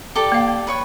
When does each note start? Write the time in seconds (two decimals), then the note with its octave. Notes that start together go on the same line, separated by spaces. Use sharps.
0.15 G4 A4 D5
0.32 A#3 F5
0.67 B4 C#5 C#6